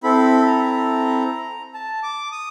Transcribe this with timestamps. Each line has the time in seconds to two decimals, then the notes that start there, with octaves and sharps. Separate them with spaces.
0.03 C4 E4 A4 B5
0.46 A#5
1.74 A5
2.03 D6
2.32 D#6